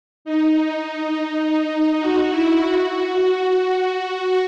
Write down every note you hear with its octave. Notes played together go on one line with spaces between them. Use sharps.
D#4
F#4
E4
F#4
F#4